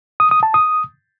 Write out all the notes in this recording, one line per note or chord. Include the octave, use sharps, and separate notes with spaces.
D#6
D#6
A5
D#6